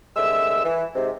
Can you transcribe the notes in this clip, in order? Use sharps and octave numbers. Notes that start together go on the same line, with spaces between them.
C2 D3 G#3 E5 E6
E3
G#2 C3